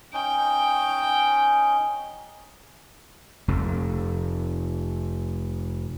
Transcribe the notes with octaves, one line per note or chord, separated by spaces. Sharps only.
C#4 D#4 G5
F1 F2